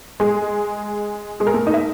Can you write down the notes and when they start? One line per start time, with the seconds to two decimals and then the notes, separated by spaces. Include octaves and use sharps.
0.20 G#3 G#4
1.40 G#3 G#4
1.47 A#4
1.54 A3 A4
1.67 D#4 D#5
1.74 E5